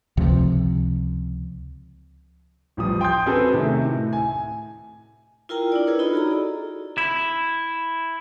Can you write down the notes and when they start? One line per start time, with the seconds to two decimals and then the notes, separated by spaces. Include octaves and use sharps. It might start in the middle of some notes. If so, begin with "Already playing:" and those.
0.17 C#2 C3 F3
2.77 A1 F3 G3 D#6
3.01 G5 C6 D#6 G6
3.26 C4 C#4 F#4 G#4 A4 B4
3.53 C3 D#3 A3
3.85 A2
4.13 G#5
5.49 E4 F4 A#4 G5 A#5
5.72 D4 E4 D5
5.87 F4 G#4 A#4 B4 C#5
5.99 D#4 E4 F#4 A4 D#5 B5
6.14 F#4 G#4 A#5
6.27 A4 D5
6.98 E4